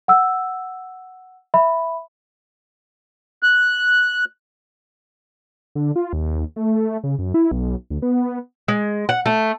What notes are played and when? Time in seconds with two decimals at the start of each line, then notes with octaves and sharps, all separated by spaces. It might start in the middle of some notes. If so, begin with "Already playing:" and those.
0.08 F#5 E6
1.54 E5 B5
3.43 F#6
5.75 D3
5.96 F4
6.13 D#2
6.56 A3
7.04 C#3
7.19 F#2
7.34 E4
7.52 B1
7.90 D2
8.02 B3
8.68 G#3
9.09 F#5
9.26 A3